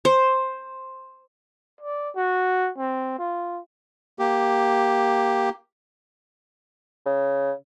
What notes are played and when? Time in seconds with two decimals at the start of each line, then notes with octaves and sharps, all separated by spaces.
0.05 C5
1.81 D5
2.16 F#4
2.78 C4
3.19 F4
4.19 A#3 G4
7.06 C#3